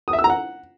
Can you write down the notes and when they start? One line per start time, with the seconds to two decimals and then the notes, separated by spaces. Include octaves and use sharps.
0.08 D#6
0.13 E5
0.19 E6
0.24 A#5
0.30 F#5